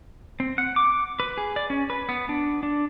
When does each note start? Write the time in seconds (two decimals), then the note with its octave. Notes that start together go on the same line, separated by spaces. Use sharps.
0.40 C4
0.58 F#5
0.76 D6
1.20 B4
1.38 G#4
1.56 D5
1.70 C#4
1.90 B4
2.09 B3
2.29 D4
2.63 D4